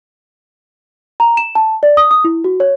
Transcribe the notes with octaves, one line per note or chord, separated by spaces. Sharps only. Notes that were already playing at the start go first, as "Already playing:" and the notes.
A#5
E7
A5
D5
D#6
D#6
E4
F#4
C#5